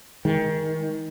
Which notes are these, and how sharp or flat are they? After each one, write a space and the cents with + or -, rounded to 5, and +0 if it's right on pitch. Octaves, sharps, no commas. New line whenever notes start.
D#3 +25 G#3 +0